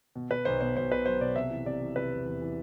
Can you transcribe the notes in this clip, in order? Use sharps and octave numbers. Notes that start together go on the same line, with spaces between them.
B2
B2 B4
B1 C5
B2 C5
B1 C5
B2 B4
F#3 C5
B2 D5
C3 E5
E3
C3 D5
E3
C3 B4
E2
E2
E3